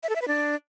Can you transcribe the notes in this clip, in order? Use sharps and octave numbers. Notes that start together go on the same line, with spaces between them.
E5
A4
E5
B4
D4